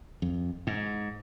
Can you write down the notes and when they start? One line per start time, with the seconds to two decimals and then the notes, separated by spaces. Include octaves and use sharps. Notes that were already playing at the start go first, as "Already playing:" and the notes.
0.22 F2
0.67 G#2